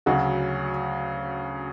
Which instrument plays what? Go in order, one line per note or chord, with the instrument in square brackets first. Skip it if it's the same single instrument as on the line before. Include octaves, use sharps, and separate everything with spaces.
[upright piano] D2 C#3 F#3 C#4 F#4